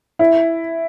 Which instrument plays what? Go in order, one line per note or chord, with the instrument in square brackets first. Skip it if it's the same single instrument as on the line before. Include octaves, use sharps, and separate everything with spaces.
[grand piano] E4